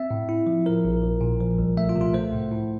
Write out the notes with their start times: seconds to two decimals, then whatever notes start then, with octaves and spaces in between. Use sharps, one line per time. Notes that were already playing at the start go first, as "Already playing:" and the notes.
Already playing: C4 E5
0.11 A2
0.29 E4
0.47 F3
0.66 F3 A#4
0.85 A#1
1.03 A#1
1.21 A#2
1.40 F3
1.58 C2
1.77 A3 E5
1.89 F4
1.96 C3
2.01 F4
2.14 A3 C5
2.32 A2
2.51 A2